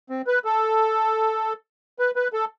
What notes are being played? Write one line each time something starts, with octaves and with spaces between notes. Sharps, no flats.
C4
B4
A4
B4
B4
A4